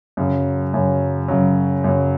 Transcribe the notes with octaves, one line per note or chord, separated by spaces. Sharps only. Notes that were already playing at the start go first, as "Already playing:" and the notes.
F#2 C#3 F#3
F#2 C#3 F#3
F#2 C#3 F#3
F#2 C#3 F#3